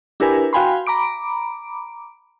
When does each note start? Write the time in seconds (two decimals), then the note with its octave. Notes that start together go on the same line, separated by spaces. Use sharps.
0.20 D4 E4 G4 A#4 B4 G#5
0.53 F#4 F5 G5 G#5 B5 C6
0.87 A#5 B5 D6 D7